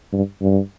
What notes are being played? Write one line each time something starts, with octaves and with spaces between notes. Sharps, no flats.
G2
G2